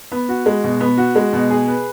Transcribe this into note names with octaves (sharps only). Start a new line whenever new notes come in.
B3
F#4
G#3
B2
B3
F#4
G#3
B2
G#4
B4